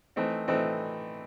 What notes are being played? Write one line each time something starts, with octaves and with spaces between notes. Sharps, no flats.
E3 A3 C4 D#4
E3 A3 C4 D#4